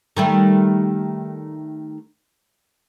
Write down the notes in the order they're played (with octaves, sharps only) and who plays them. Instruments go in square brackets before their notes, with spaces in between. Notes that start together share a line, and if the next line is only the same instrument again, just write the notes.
[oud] D#3 G3 A3